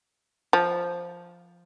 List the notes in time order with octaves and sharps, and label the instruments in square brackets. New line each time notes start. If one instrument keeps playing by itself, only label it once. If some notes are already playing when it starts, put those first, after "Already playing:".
[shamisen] F3